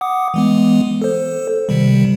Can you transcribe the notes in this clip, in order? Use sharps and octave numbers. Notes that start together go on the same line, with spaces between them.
F#5 D6 D#6
E3 G#3 B3
A4 C5
C3 D#3 G3